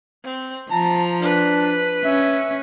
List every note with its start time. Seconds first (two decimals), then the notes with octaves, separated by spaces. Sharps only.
0.24 C4
0.71 F3 A5 A#5
1.22 D4 B4
2.04 C#4 E5